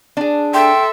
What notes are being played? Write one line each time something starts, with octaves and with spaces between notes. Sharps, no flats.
D4 G#4
A4 E5 G5 C6